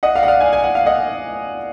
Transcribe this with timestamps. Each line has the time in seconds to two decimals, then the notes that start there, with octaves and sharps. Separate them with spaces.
0.03 D#5 F#5
0.15 D5 F5
0.23 F#5
0.28 D5 F5
0.40 F5 G#5
0.53 G#5
0.64 F#5
0.75 F5
0.86 D#5 F#5